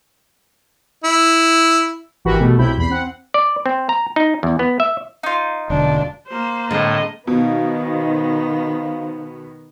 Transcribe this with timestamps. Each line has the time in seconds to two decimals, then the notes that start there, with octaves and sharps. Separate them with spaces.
1.04 E4
2.25 G#1 E3 F#4 G4 A#4 B5
2.40 B2 A3
2.58 B1 C3 E4 B5 G6
2.78 E2 B5 C7
2.90 C4 F#5
3.34 D5
3.66 C4
3.89 A#5
4.16 D#4
4.43 E2
4.59 B3
4.80 E5
5.23 D#4 F4
5.70 E1 D3 D4
6.27 A#3 C5
6.71 A2 D3 G#3 C4 D#5
7.27 B2 D#3 B3 D#4 C5 F5